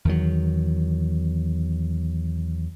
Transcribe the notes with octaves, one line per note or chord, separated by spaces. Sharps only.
E2 D#3 F#3